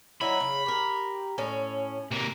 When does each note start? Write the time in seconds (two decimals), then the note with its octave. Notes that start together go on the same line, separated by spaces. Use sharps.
0.21 F#3 D#4 E4 B5
0.40 C#3
0.66 G4 A#4
1.38 A2 C#4
2.11 C3 A#3